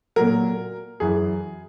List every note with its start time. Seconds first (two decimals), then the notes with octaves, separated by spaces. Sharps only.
0.16 A#2 F#3 A#4
1.00 F#2 E3 G#4